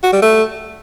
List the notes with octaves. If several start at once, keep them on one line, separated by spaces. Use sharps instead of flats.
F#4
G3
A3